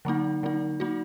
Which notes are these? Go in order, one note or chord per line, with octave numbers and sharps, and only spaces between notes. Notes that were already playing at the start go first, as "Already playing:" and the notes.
D3 F#3 A#3 D#4
D3 F#3 A#3 D#4
F#3 A#3 D#4 F#4